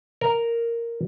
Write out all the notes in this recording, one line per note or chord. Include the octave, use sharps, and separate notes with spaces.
A#4